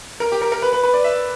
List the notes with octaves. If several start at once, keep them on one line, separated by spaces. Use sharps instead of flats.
A#4
G4
A#4
A#4
B4
B4
B4
D5
E5